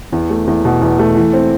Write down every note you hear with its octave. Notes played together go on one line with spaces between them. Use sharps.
E2
A3
E2
B2
E2
A3
E3
C4